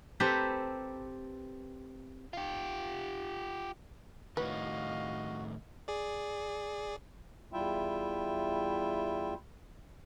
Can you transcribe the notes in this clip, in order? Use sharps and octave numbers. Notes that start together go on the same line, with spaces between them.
C4 G4 A4 B4 A#5
F4 G4
A2 D#3 F#4 B4 D#5 F5
G#4 D5
E2 G3 E4 F4 E5 G5